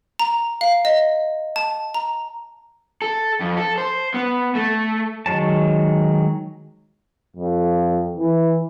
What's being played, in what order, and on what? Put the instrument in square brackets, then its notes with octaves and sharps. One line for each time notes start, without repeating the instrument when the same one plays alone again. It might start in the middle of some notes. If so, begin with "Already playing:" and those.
[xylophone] A#5
F5
D#5
A5
A#5
[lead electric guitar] A4
F2
A4
C5
B3
A3
[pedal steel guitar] D#3 F#3 G#3 C#5 A5
[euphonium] F2
E3